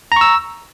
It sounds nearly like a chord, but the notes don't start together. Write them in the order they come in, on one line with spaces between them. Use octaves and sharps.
A#5 C#6 E6